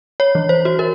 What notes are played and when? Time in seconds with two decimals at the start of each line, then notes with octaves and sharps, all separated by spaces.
0.20 C#5
0.35 E3
0.49 C5
0.65 F#4
0.79 A#4